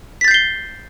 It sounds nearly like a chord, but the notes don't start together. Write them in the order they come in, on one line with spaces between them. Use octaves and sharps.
B6 A6 G6 C7 G7